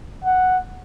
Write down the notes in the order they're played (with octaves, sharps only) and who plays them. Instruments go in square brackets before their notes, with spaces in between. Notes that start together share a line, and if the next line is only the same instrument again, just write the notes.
[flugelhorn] F#5